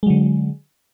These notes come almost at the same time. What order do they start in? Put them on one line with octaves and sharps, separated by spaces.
G#3 F#3 D3